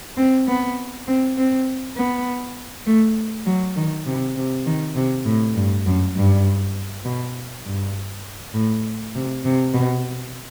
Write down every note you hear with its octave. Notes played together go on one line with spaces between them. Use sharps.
C4
B3
C4
C4
B3
A3
F#3
D#3
C3
C3
D#3
C3
A2
G2
F#2
G2
B2
G2
A2
C3
C3
B2